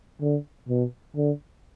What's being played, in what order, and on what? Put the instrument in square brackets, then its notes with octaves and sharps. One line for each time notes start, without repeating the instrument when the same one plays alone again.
[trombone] D3
B2
D3